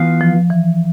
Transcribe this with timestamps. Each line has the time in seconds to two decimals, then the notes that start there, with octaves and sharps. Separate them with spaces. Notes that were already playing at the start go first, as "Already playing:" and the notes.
Already playing: E3 B3 F4 B4 F5
0.21 F3
0.50 E3